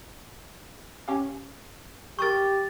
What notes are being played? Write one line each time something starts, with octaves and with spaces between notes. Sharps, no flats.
C#4 G4 F5
G4 A#4 C#6 D#6 G6 A6